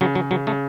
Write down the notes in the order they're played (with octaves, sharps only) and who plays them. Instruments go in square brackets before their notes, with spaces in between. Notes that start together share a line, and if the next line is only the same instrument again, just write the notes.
[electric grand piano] C#3 [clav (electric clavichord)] F#3
[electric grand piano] C#3 [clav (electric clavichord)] F#3
[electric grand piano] C#3 [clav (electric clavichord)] F#3
[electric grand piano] C#3 [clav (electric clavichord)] A3